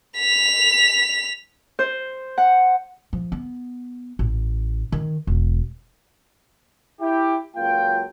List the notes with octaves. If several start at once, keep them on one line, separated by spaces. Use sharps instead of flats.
B6 F7
C5
F#5
F3
B3
A1
D#3
E1
E4 G4
C#2 F#3 A#3 F4 G5